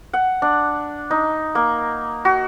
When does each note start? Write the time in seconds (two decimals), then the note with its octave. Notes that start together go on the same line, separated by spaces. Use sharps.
0.13 F#5
0.42 D4
1.11 D#4
1.55 A#3
2.25 F#4